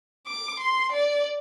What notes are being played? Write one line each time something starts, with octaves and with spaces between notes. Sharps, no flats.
D6
C6
D5